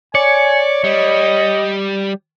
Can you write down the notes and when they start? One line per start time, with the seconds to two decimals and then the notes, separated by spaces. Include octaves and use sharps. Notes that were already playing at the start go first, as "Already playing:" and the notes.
0.15 C#5 D5 G#5 C#7
0.84 G3 D#5